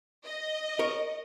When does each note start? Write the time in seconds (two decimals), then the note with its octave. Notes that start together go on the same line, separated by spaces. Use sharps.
0.24 D#5
0.79 A#4 C#5